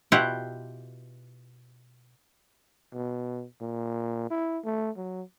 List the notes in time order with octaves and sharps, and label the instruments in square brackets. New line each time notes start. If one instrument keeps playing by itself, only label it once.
[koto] B2 E4 F4 G4 F#5
[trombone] B2
A#2
E4
A3
F#3